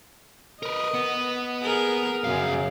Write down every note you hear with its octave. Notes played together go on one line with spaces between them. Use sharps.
A#4 B4 D#5
B3
G#4 A#4
C2 F#2 C#3 F5